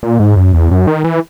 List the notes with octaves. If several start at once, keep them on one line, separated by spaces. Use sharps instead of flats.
A#2
G#2
F#2
E2
F#2
D#3
E3